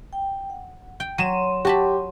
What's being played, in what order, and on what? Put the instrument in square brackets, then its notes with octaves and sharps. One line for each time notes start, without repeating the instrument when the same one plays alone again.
[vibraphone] G5
F#5
[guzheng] G5
[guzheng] F#3 [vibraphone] C#5 C6 [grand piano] D#7 E7
[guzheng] F#4 A5 B5 [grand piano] G4